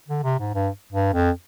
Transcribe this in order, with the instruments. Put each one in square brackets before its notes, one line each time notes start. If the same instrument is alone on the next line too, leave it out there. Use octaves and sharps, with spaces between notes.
[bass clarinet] D3
C3
G#2
G2
G2
F2